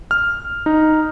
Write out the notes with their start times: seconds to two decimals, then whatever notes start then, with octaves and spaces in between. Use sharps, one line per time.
0.11 F6
0.66 D#4